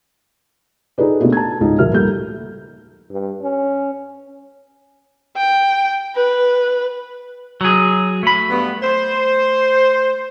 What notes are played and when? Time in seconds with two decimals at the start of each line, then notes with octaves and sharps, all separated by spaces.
0.98 D#4 G#4 A4 B4 D5
1.20 B2 A3 A#3 D4 F#4 G4
1.32 A5 G#6
1.61 C#2 G#2 D#4
1.79 D#1 F3 F#4 A#4 E5 F6
1.92 G3 A#3 A4 G6
3.10 G2
3.41 C#4
5.37 G5
6.15 B4
7.61 F#3 G#4
8.23 A3 B5
8.50 G2 B3
8.83 C5